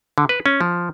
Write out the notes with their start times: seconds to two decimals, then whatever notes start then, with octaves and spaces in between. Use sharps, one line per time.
0.18 D3
0.29 B4
0.46 C#4
0.61 F3